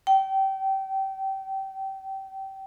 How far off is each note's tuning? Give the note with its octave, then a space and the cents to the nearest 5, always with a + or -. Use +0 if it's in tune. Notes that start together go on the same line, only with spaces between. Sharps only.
G5 -25